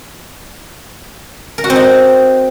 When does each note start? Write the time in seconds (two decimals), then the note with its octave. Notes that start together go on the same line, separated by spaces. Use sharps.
1.58 A#4
1.64 F#4
1.70 C4
1.76 D#4